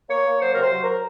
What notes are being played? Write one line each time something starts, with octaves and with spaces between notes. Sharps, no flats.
A#3 C#5
A#3
F#3 C5
C3 A#4
C5
F#3
A#4